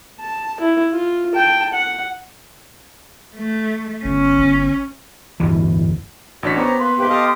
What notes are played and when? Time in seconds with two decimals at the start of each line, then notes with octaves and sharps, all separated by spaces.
0.19 A5
0.60 E4
0.92 F4
1.34 G5 A5
1.73 F#5
3.35 A3
4.05 G1 C#4
4.39 G1
5.40 D1 G1 E2 E3
6.43 A1 D4 F#4 C#5 B6
6.57 B3 G4 C5 C#5 A#5
6.79 A#3 B4 C6
6.98 G#2 C3 A#3 G4 B4
7.09 G4 A4 D#5 F5 D#6